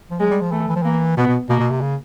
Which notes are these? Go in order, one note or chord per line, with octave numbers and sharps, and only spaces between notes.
F3
F#3 G#3
G3
F3
E3 A3
E3
F3
E3 A#3
B2 B3
B2
B2 A#3
B2
C3
C#3